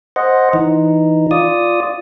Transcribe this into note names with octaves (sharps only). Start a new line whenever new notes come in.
C5 D#5 F#5
E3 D#4
F4 D5 D#6